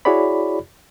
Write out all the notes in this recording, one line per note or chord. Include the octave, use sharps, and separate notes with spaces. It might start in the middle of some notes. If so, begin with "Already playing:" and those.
E4 F#4 G#4 C#5 D5 B5